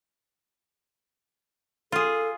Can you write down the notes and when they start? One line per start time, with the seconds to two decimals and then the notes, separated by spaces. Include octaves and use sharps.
1.92 F4 G#4 A4